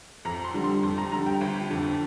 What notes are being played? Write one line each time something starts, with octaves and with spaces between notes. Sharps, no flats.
F2 A#5
C6
D3 G3
C6
F2 C6
A#5
D3 G3 A#5
G5
G1
F2 D3